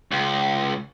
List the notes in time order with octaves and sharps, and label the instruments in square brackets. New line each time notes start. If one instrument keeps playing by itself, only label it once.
[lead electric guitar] C#2